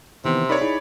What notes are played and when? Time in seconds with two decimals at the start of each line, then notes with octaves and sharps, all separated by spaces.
0.25 C3 D#3 E3 B3
0.49 D#4 A#4 C#5 D5 B5
0.61 D#4 E4 G#4